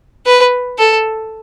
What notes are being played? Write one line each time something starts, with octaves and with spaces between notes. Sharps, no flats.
B4
A4